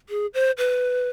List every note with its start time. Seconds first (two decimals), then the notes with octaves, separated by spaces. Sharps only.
0.09 G#4
0.34 C5
0.58 B4